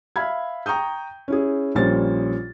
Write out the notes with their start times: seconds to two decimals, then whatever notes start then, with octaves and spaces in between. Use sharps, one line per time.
0.16 E5 F5 B5 G#6
0.66 G5 A#5 C#6 D#6 G6
1.28 C#4 E4 G#4
1.75 A#1 A#2 G3 C#4 C5 A6